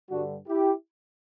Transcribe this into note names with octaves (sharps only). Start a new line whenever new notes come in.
G2 D3 G3 D4 F#4
E4 G4